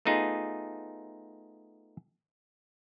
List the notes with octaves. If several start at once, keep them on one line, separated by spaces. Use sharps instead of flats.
A3 B3 D#4 F4 G#4